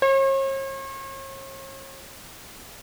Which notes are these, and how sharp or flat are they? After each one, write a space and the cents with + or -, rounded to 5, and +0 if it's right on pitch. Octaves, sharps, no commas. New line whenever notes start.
C#5 -45